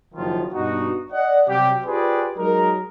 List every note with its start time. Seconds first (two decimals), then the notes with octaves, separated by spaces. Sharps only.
0.14 F#1 F#2 D#3 F3 F4
0.53 G2 B2 D#4 F#4
1.12 D5 D#5 F#5
1.47 C3 F#3 G3 G4
1.85 F4 G4 G#4 B4 C5 D5
2.37 F#3 G#3 D#4 A#4